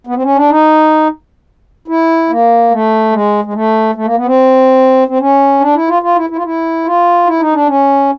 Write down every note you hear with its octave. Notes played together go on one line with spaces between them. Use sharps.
B3
C4
C#4
D4
D#4
E4
A#3
A3
G#3
G#3
A3
A3
A#3
B3
C4
C4
C#4
D4
E4
F4
F4
E4
E4
F4
E4
F4
E4
D#4
D4
C#4